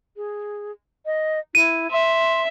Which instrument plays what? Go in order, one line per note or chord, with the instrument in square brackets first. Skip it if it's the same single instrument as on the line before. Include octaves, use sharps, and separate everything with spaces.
[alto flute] G#4
D#5
[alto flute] E4 [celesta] D#7
[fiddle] E5 [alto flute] C6